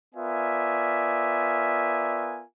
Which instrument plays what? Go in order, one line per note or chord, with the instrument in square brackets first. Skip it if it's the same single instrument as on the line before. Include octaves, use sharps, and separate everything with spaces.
[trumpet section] B3 F4 A#4 D5 E5 G#5